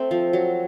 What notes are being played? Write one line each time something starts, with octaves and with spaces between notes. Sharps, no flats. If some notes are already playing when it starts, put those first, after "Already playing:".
Already playing: A3 C4
F3
F#3